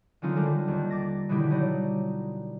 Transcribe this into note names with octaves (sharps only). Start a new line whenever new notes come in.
D3 D#3 F#3 C#4 D#4 F4
D3 G3 A4 A#4
D#2
D6 A6 A#6
B2 D3 D#3 G3 E4 G4
F#3 D#4 D5